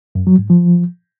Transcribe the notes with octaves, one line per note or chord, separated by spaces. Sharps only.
F#2
F#3
G#2
F3